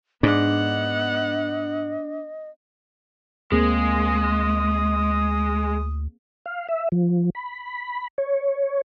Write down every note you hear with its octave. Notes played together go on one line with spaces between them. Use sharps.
G#2 B3 D4 D#5 F#5
D2 G#3 A#3 C4 G#4 D#6
F5
E5
F3
B5
C#5